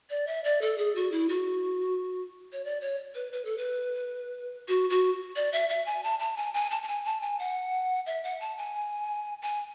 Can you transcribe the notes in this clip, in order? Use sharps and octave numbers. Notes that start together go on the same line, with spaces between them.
D5
E5
D5
A4
G#4
F#4
E4
F#4
C#5
D5
C#5
B4
B4
A4
B4
F#4
F#4
D5
E5
E5
G#5
A5
A5
G#5
G#5
A5
A5
G#5
A5
G#5
F#5
E5
F#5
A5
G#5
G#5